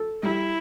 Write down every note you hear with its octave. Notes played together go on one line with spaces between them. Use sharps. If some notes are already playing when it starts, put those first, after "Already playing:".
Already playing: A4
G3 E4